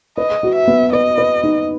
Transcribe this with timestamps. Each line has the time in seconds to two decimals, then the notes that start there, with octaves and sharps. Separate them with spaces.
0.17 B4 D#5
0.43 F#4
0.55 E5
0.68 B3
0.93 B4 D#5
1.18 B4
1.43 D#4